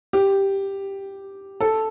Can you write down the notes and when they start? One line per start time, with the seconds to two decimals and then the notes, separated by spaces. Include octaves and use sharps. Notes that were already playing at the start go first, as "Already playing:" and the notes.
0.13 G4
1.60 A4